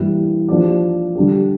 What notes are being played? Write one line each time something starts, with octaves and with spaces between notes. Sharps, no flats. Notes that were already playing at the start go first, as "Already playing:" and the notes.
Already playing: G2 E3 G3 A#3 E4
F3 A#3 D4 G4 D5
D3 G3 D4 G4